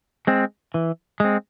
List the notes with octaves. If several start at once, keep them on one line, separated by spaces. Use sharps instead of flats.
G#3 C4
E3
G#3 C4